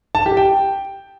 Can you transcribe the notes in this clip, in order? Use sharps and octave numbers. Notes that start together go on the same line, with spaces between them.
A5
G4
G5